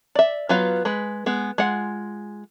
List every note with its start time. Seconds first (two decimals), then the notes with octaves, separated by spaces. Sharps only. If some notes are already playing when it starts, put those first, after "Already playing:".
0.15 D5 E5
0.49 F#3 B3 F4 B4 F5
0.85 G#3 B4
1.26 G#3 B3
1.58 G#3 F4 F#5